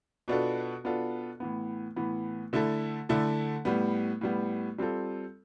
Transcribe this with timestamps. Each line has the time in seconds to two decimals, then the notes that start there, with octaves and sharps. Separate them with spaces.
0.28 B2 B3 D4 F4 A4
0.84 B2 B3 D4 F4 A4
1.40 A2 E3 B3
1.96 A2 E3 B3
2.53 D3 A3 E4 A4
3.09 D3 A3 E4 A4
3.65 A2 G3 B3
4.21 A2 G3 B3
4.78 G3 C4 F4 A4